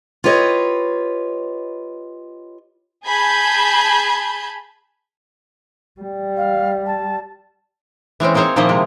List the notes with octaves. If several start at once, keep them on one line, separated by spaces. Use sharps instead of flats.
F4 G4 B4 C#5 D#5
G#4 A5 B5 G6 G#6
G3
F5
A5
E3 G#3 C4 C#4
A#3 C4 D#4 G#4 C5 C#5
A#2 D#3 F3 A#3 E4 D#5
C3 G#3